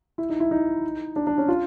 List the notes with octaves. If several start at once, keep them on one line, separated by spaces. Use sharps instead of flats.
E4
D#4
E4
D#4
D4
D4
C#4
F4